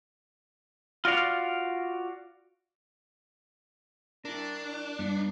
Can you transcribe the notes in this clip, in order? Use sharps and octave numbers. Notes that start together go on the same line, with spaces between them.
F4 F#4 D5 F5
D4 E4 A#4
G2 B3